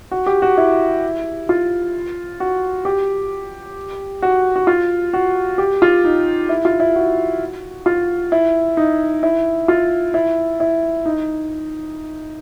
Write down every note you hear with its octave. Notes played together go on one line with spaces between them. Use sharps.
F#4
G4
F#4
E4
F4
F#4
G4
F#4
F#4
F4
F#4
G4
F4
D#4
E4
F4
E4
F#4
F4
E4
D#4
E4
F4
E4
E4
D#4